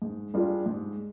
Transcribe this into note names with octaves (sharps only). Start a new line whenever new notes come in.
G#2
G3 D4 F4 G#4
G#2